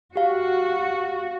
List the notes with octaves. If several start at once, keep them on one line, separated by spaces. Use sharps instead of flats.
F#4 G4 F5